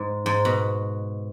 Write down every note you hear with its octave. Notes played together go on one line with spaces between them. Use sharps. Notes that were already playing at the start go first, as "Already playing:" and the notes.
Already playing: G#2
G#2
B2